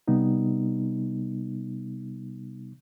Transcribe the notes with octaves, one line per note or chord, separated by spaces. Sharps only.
C3 G3 B3 D#4